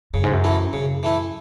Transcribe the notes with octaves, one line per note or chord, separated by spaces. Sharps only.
F#2 C#3
G#2
F#2
E3 A3 E4
F#2 C#3
E3 A3 E4